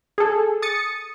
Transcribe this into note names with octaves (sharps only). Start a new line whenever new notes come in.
G#4 A4
D#6 A6 C#7